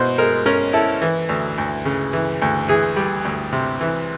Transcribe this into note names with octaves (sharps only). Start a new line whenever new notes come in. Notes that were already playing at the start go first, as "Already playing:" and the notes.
Already playing: B2 E4 C5
G#3 A#4
C#4 A#4
E4 A4
E3
D2
D2
C#3
E3
D2
E3 G#4
G3
D2
C3
E3